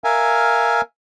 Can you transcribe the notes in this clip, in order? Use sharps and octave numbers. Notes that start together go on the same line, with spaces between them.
A#4 E5 F5 G#5